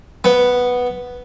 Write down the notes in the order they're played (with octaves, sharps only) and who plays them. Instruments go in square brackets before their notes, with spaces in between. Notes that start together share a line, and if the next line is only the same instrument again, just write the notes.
[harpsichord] B3